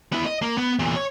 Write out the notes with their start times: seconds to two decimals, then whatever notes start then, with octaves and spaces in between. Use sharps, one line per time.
0.13 B3 E4
0.26 D#5
0.42 A#3
0.58 B3
0.79 E2 A#2
0.96 C#5